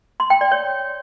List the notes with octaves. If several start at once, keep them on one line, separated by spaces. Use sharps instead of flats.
C6
G5
D5
C#5